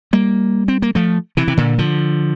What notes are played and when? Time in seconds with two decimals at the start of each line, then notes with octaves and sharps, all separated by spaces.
0.13 G3 A#3
0.68 C4
0.82 A#3
0.95 F3 A3
1.37 C3 E3
1.48 C3
1.57 A#2 D3
1.78 D3 F3